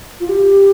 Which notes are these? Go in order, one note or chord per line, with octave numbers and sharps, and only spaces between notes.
F4
G4